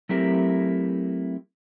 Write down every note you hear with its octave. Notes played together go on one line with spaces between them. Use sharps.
F#3 A3 C4 E4 G4 A#4